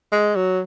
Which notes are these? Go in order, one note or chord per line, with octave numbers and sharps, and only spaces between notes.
G#3
F#3